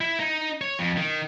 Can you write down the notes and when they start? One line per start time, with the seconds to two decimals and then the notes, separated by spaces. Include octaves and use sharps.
0.01 E4
0.20 D#4
0.61 C#5
0.79 F2
0.97 D#3